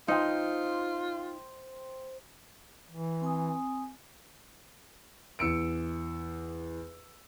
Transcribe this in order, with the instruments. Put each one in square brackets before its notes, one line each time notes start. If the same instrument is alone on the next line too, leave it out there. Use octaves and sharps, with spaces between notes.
[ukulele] D#4 [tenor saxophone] F4 [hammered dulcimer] C5 G5
[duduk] E3
[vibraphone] C4 G#5 D#6
[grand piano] E2 E6 C#7 D7